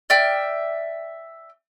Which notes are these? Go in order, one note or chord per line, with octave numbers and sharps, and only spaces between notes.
D5 E5 G5 F6